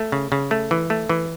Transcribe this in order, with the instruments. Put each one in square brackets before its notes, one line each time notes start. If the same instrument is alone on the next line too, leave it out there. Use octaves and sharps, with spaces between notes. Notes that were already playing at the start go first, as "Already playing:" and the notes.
Already playing: [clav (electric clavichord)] A3
C#3
C#3
A3
E3
A3
E3